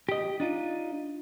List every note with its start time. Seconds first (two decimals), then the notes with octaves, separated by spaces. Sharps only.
0.09 G4 D#5
0.40 D4 D#4 F4